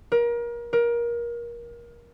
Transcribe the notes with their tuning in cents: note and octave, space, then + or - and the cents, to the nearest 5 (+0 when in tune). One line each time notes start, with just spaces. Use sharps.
A#4 +30
A#4 +25